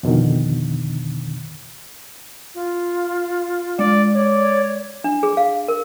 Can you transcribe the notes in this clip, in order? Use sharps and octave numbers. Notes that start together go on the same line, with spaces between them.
F2 B2 D3 D#3
F4
G#3 D5
C#5 D5
D4
G#4
F5
A#4